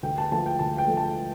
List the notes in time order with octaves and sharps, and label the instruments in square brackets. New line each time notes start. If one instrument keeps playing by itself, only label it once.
[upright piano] D2 G5
A5
D3 F3 A3 A5
G5
D2 A5
G5
D3 F3 A3
A5